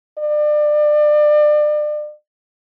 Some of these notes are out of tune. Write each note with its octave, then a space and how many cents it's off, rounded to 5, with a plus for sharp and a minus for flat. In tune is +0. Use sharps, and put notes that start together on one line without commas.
D5 +30